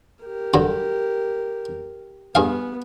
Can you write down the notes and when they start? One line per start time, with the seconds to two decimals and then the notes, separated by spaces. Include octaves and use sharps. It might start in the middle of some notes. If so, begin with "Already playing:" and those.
0.24 G4 A#4
0.54 G2 D3 F#3
2.35 G2 B3 G#4 F5